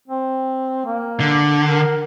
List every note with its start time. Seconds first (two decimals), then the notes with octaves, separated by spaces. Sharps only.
0.08 C4
0.86 A#3
1.20 D3
1.66 A#4